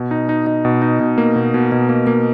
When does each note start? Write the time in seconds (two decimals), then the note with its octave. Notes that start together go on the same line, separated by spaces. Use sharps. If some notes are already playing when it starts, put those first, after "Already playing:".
Already playing: B2
0.11 D#4
0.29 D#4
0.47 D#4
0.65 B2
0.82 D#4
1.00 B2
1.18 A#3
1.36 B2
1.54 B2
1.72 B2
1.89 A#3
2.07 A#3